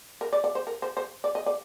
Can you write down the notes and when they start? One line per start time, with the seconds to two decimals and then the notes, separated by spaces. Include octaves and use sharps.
0.21 A#4
0.33 D5
0.44 D5
0.55 C5
0.67 A#4
0.82 C5
0.97 C5
1.24 D5
1.35 D#5
1.46 D5